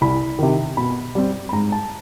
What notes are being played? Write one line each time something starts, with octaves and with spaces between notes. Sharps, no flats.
C2 B5
C3 D#3
B2 B5
G3 C4
B5
G#2 A#5
A5